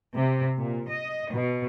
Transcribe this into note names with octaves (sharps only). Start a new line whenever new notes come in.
C3
A#2
D#5
B2